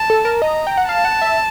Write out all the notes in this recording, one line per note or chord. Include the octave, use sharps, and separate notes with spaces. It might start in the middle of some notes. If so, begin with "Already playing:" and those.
Already playing: A5
A4
A#4
D#5 A#5
G5
F#5
F5 A5
F#5
E5